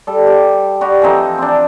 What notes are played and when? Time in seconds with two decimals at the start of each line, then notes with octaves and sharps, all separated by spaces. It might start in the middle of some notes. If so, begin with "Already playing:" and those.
0.07 G3 A4
0.27 G4
0.81 G3 F#4
1.02 E3 F3 C4 D#4
1.38 C4 D4